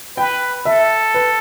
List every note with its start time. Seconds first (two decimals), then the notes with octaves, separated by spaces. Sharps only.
0.16 B4 G5
0.65 A4 E5
1.14 B4